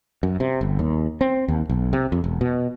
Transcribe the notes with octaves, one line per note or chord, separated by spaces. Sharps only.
F#2
C3
G1
D#2
C4
D#2
B1
C3
F2
E1
B2